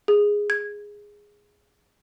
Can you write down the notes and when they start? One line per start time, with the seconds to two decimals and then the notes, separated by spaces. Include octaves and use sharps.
0.08 G#4
0.50 G#6